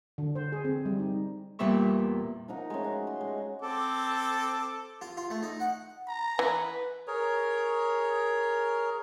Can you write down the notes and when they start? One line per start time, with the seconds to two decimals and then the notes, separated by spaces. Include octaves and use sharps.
0.18 D3
0.35 C5
0.52 G#4
0.65 C4
0.85 G3
0.99 D#4
1.59 E2 A#2 G3 B3 E5 C#6
2.48 F3 D#4 A#4 F#5
2.70 G#3 A3 C#4
2.84 F#4
3.07 C6
3.21 G#3
3.62 C4 A4 D6
5.01 F4
5.17 F4
5.30 A3
5.42 D#4
5.60 F#5
6.08 A#5
6.39 E3 B4
7.07 G#4 A#4 C#5